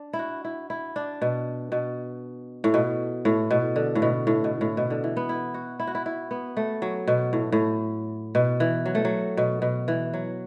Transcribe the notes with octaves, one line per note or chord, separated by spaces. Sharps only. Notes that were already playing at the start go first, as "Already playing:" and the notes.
Already playing: D4
E4
F#4
E4
E4
D4
B2
B2
A2
B2
A2
B2
D3
A2
B2
A2
B2
A2
B2
D3
E3
B3
E4
F#4
E4
F#4
E4
E4
B3
A3
F#3
B2
A2
A2
B2
E3
F#3
A3
F#3
B2
B2
E3
F#3